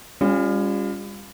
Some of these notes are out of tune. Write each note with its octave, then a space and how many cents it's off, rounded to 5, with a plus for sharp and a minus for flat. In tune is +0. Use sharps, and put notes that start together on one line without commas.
G3 +40 C#4 +0 F4 +10